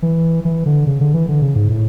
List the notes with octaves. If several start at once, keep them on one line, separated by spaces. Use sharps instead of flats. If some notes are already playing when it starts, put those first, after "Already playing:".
E3
E3
D3
C#3
D3
E3
D3
C#3
G#2
A2